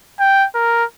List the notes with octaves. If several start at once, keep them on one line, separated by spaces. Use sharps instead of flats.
G5
A#4